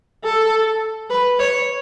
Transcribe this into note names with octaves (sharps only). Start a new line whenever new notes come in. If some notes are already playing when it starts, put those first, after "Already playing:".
A4
B4
C#5